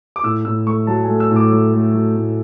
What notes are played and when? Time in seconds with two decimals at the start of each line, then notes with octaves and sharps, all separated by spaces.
0.16 D6
0.23 A2 E6
0.45 A2 E6
0.66 A3 C#6
0.87 F#3 A5
1.03 G#5
1.08 A3
1.20 E6
1.31 A2
1.36 D6
1.52 F#3
1.73 A3
1.94 F#3
2.16 A2